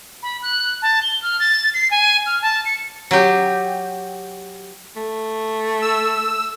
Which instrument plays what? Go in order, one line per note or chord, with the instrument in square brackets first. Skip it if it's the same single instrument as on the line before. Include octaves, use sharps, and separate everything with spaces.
[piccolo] B5
F#6
A5
G7
F6
A6
C7
G#5
F6
A5
C#7
[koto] F#3 G4
[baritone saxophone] A3
[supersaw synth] E6